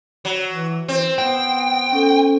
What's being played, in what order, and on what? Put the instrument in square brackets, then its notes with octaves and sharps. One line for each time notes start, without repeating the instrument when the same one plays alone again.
[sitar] F#3
[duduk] E3
[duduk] E3 [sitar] C4
[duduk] B3 [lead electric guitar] G5
[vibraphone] C#4 A4